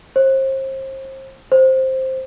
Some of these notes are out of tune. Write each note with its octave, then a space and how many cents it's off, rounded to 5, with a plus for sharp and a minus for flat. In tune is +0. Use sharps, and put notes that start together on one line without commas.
C5 +35
C5 +5